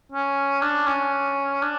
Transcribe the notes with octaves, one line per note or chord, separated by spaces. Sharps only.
C#4
D4
C#4
D4